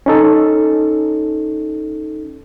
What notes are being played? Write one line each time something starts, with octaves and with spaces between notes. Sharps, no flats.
C#4 D#4 A4